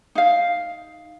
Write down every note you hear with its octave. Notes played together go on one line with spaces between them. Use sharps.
D#4 F5